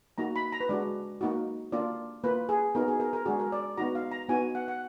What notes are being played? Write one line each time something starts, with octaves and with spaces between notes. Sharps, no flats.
A#3 D#4 F#4 A#5
B5
A#5
B4
G#3 D4 F#4 D5
A#3 D#4 F#4
A#3 D4 F4 D5
A#3 F4 B4
G#4
B3 D#4 F#4 A#4
G#4
A#4
A#4
G#3 D4 F#4 G#4
A#4
D5
B3 D#4 F#4 A#5
F5
A#5
B3 D#4 F#4 G#5
F#5
F#5